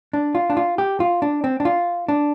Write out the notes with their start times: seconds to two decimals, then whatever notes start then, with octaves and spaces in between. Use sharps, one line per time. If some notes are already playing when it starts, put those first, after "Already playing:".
0.13 D4
0.35 F4
0.50 D4
0.57 F4
0.78 G4
1.00 F4
1.22 D4
1.44 C4
1.60 D4
1.65 F4
2.08 D4